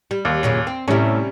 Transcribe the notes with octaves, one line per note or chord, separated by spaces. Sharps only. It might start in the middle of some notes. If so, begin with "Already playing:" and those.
G3
D#2
F#2 A#2 C#3
C4
A2 C3 G3 C#4 E4